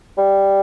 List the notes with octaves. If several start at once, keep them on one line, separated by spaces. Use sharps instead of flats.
G3